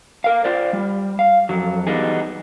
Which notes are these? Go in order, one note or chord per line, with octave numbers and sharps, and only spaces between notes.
A#4 F5
F4 C5 D5
G3
F5
F2 F#3
E3 G3 B3 D#4 G#4